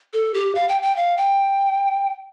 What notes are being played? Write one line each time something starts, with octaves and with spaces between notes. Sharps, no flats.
A4
G4
F5
G5
G5
F5
G5